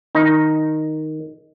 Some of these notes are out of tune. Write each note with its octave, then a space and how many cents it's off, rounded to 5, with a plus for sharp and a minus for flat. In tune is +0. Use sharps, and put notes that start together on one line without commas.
D#3 +0 D#4 +0